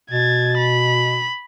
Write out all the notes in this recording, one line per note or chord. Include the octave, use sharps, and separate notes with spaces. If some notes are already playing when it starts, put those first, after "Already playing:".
B2 G#6 A6
B5